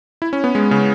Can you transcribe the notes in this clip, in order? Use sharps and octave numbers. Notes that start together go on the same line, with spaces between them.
E4
C#4
B3
G#3
C#3